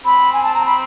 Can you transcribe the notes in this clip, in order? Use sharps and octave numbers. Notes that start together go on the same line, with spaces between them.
C4 B5
G#5
A5
A#5
B5